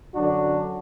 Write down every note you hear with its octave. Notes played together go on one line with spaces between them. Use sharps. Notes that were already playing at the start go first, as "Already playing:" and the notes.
F#2 D3 F#3 D4 F#4